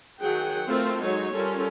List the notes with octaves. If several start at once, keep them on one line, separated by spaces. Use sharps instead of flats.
D#3 F#3 G#4 F#5 G5
A3 C4 F4 A4 A#4 C5
F#3 G#3 D#4 C#5
G3 C#4 F4 A4 A#4